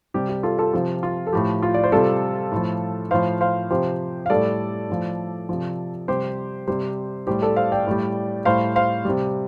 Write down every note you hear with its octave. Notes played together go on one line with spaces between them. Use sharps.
C3 G3 G4
G4
F4 A4
F4 A4
C3 F3 F4
F4
A4
A2 F3 G4
F4
D5
C5
C3 G3 F4 A4
A2 F3
A2 F3 C5 F5
C5 F5
C3 F3 G4 C5
F5
A2 G3 A4 D5
A2 F3
C3 F3
C3 G3 G4 C5
C3 G3 G4 C5
A2 G3 G4 C5
A4 D5
C5 F5
D5 G5
A2 G3
A2 G3 C5 F5
C5 F5
C3 G3